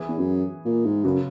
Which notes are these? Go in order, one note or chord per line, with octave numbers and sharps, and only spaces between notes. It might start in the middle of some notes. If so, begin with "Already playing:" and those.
Already playing: E3 B3 E4 G#4
E2
F#2
A#2
G#2
F#2 C#3 F#3 B3 F#4